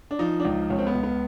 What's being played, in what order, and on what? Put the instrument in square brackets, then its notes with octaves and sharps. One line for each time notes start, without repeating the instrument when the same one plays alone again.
[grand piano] D4
F3 D#4
D4
C#2 D#4
C#2 C#4
C4
B3
C#2
B3